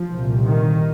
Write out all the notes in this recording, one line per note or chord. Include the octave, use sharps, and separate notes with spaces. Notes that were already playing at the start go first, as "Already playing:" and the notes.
Already playing: F3
C2 A#2
D#3